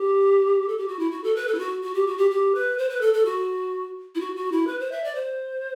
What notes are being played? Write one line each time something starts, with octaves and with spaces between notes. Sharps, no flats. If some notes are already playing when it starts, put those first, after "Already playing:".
Already playing: G4
A4
G4
F#4
E4
F#4
A4
B4
A4
E4
F#4
F#4
G4
F#4
G4
G4
B4
C5
B4
A4
A4
F#4
E4
F#4
F#4
E4
B4
C5
E5
D5
C5